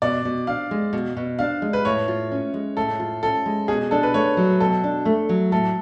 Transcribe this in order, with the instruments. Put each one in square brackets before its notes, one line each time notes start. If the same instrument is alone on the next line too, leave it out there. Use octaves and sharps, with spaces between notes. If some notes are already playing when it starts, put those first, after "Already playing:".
[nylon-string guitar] B2 [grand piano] D5
[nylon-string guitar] B2
[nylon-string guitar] D4 [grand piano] F5
[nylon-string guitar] G#3
B2
B2
[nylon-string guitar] D4 [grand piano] F5
[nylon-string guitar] G#3
[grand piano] B4
[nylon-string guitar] A2 [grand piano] C#5
[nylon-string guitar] F4
C#4
G#3
[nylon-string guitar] A2 [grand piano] A4
[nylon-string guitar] F4
[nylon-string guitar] C#4 [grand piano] A4
[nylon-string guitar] G#3
[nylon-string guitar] B2 [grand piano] G#4
[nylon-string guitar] D4 [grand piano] A4
[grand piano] B4
[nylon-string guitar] A3 [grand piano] C#5
[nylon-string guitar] F#3
[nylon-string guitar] B2 [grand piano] A4
[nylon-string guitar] D4
A3
F#3
[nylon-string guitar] A2 [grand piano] A4